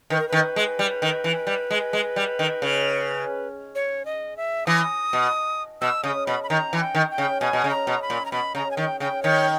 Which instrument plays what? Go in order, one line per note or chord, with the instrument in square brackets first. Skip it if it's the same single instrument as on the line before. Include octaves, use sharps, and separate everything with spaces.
[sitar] D#3 [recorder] B4
[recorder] A#4
[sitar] D#3 [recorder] B4
[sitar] G#3
G3
D#3
E3
G3
G#3
G#3
G3
D#3
C#3
[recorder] C#5
D#5
E5
[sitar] E3 [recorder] D#6
[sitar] B2
[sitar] B2 [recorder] E6
[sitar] C#3 [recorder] D#6
[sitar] B2 [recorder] B5
[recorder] B5
[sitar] D#3 [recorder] A#5
[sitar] E3
[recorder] G5
[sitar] D#3
[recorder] G5
[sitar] C#3
[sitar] B2 [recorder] G#5
[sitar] B2
C#3
[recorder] A#5
[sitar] B2
[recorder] B5
[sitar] A#2
[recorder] A#5
[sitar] B2 [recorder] B5
[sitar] C#3 [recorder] A#5
[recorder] G#5
[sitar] D#3 [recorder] G5
[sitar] C#3 [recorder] G5
[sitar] D#3 [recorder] C#5